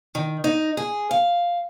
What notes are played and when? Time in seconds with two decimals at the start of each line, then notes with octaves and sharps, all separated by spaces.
0.15 D#3
0.44 D#4
0.77 G#4
1.11 F5